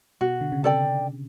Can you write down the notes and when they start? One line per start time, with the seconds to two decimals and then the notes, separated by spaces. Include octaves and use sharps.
0.21 B2 F#4
0.41 D3
0.52 C#3
0.63 C3 A4 D5 G5